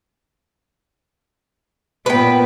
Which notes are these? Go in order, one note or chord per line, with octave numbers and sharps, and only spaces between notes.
A#2 B3 B4 G5